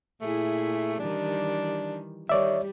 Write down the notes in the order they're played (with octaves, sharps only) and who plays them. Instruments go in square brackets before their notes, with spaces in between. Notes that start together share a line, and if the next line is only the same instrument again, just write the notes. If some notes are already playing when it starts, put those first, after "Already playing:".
[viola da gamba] A#2 E4 G#4 [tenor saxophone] A3
[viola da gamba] D#3 E3 G3 [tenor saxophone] D4
[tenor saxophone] D#3 [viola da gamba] G3 [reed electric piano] C#5 D5 E5